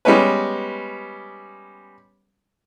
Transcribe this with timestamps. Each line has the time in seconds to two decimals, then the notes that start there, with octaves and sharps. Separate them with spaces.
0.05 G3 G#3 B3 C#4 B4